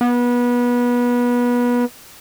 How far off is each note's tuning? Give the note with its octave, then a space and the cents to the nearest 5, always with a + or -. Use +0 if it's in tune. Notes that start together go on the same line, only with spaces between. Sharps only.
B3 -25